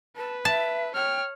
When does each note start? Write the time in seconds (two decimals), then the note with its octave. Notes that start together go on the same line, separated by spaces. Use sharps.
0.16 B4 A5
0.45 E5 A5
0.94 C#5 G5 F6